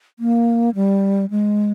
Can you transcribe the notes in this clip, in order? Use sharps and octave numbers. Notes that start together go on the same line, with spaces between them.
A#3
G3
G#3